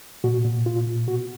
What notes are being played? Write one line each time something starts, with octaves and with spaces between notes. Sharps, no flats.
A#2 F#4
A#2
A#2 F4
A#2
B2 F#4